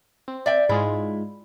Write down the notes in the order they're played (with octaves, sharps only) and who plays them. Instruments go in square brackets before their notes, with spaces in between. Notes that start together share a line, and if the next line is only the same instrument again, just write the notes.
[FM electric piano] C4
[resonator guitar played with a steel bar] D5 E5 G5
[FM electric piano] G#2 G#3 F4 [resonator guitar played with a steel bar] E4